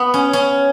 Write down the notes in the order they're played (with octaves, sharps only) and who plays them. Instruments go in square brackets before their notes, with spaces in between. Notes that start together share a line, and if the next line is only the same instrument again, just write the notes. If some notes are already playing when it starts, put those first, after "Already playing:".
Already playing: [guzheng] B3
C#4
C#4